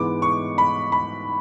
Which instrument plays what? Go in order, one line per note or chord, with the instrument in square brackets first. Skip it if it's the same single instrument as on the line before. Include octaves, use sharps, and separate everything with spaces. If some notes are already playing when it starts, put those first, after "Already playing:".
Already playing: [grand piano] G#2 E3 G#3 B3 D6
C#6
B5
B5